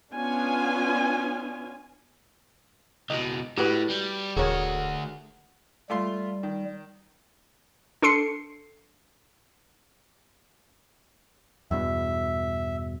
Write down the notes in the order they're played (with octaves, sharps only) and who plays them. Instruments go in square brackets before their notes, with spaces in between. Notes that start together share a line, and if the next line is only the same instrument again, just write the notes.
[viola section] B3 C#4 D4 F4 G#5
[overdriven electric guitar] C#2 B2 [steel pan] D#5
[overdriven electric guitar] A2 [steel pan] F#4 G4 B4
[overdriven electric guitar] G3
[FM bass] D#1 [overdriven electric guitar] D2 F#4 [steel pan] G#4 A#4 C#5
[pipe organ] G3 [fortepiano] A3 F4 C6
[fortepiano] D#3
[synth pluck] D4 A4 C6 C7 C#7
[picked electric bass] E2 G2 B2 [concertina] E5